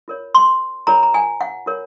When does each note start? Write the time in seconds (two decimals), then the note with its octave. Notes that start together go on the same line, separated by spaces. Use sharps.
0.08 F4 A#4 C#5
0.35 C6
0.87 F4 A#4 C#5 A#5
1.03 A#5
1.14 G#5
1.41 F#5
1.66 F4 A#4 C#5